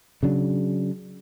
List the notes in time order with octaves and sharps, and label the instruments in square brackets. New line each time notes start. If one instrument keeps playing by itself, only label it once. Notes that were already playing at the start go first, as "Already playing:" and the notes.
[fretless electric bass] C#3 F#3 D4